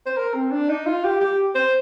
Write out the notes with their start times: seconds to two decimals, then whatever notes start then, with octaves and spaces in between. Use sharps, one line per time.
0.06 C5
0.17 A#4
0.34 C4
0.51 D4
0.69 D#4
0.86 F4
1.04 G4
1.21 G4
1.55 C5